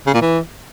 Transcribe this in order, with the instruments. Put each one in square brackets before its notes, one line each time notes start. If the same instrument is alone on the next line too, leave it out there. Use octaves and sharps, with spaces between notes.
[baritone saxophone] C#3
A#2
E3